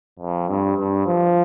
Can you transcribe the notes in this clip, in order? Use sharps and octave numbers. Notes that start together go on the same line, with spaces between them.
F2
G2
G2
F3